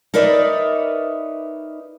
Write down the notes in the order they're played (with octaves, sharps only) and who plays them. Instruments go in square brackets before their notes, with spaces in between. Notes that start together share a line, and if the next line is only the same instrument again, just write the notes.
[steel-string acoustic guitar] D#4 A#4 B4 C#5 D5 E5